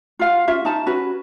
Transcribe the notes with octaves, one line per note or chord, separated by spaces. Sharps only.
F4 F5 F#5
C#4 F4 E5
D#4 A5
C#4 F#4 B4